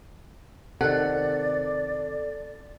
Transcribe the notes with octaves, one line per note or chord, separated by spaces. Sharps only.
C3 D#3 A4 D5 F#5